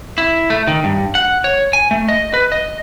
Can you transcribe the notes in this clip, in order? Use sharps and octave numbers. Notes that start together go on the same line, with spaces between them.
E4
A3
D#3
G2
F#5
C#5
G#5
A3
D#5
B4
D#5